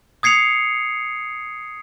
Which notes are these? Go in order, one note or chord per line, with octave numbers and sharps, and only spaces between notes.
D#6 G#6 C7 C#7 F7